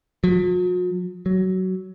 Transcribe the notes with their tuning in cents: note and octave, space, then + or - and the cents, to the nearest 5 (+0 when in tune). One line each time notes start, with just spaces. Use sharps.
F#3 -45
F#3 +15